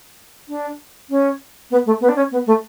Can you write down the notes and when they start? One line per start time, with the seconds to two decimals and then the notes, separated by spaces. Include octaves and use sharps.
0.49 D4
1.10 C#4
1.71 B3
1.86 A3
2.01 B3
2.09 D4
2.16 C#4
2.31 B3
2.46 A3